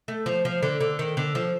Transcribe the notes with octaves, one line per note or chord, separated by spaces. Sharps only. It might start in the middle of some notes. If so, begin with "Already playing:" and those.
A3
F3
F3
D3
D3
D#3
D3
F3